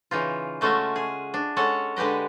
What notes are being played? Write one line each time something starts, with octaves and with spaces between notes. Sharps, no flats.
C#3 E3 D#4 F4
G#3 A3 C#4 F4 F#4 E5
G#4
D4
G#3 C#4 A4 C#5 F#5
D3 G#3 G4 B4 D#5